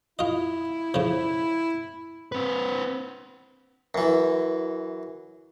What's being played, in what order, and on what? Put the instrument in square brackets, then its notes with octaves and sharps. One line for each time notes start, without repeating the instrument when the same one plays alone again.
[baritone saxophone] E4 [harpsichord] F4 D#5
[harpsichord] C#3 F3
[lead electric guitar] C4 B4
[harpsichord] F#2 E3